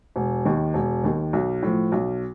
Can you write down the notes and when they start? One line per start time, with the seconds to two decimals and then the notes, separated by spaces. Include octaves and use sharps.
0.16 E1
0.45 D#2 D#3
0.74 E1
1.04 D#2 D#3
1.33 B1
1.62 A2 F3
1.92 B1